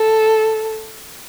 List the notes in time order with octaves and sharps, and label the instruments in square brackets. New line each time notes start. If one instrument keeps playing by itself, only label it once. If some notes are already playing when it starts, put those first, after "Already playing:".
Already playing: [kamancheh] A4